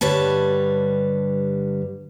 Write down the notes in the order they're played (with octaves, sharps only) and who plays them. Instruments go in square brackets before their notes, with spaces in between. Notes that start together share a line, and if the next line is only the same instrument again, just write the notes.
[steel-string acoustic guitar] G2 D3 G3 B4 C#5 A5